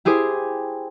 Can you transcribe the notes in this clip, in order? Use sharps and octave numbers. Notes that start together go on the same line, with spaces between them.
E4 G4 G#4 C5